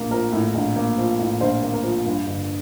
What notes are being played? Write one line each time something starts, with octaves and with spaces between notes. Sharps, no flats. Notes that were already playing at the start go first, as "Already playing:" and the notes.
Already playing: A#1 A2 A#3 A#4
F3 A#4
A2
A#1
A#3
F3
A2
A#1 C5
A#3
A#4
F3
G2
G1